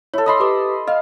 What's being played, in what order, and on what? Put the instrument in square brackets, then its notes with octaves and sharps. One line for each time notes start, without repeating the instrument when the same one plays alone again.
[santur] E4 A4 [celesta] C#5
[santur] D#5 B5 C6
[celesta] G4 B4 D6
[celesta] D#5 [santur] F5